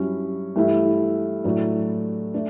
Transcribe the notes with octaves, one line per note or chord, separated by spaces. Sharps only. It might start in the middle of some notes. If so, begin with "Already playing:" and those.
Already playing: G2 F#3 C#4 E4
G2 E3 A3 E4
A2 F#3 A3 D4
A3 D4